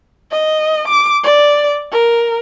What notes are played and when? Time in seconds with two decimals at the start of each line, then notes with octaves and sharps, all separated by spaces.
0.31 D#5
0.88 D6
1.23 D5
1.92 A#4